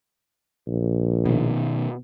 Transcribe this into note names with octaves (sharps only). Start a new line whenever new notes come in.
A#1
B2 D#3